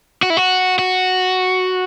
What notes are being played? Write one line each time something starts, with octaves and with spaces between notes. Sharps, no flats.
F#4
E4
F#4
F#4